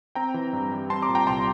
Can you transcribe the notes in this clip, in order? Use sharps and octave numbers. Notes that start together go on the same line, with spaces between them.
C4 G5 A#5
E3
G2
G3
C4 A5 C6
A#5 D6
A#2
G5 A#5
C2 A5 C6